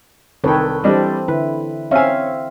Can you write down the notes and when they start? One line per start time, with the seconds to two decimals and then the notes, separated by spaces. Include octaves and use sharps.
0.44 C2 D#3 A4 B4 C#5 G5
0.84 E3 G3 C4 D4 A4 D#5
1.28 D3 E4 B4
1.91 C4 C#4 E5 F5 G#5